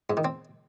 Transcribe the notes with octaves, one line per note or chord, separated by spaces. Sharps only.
G#2
D#3
C4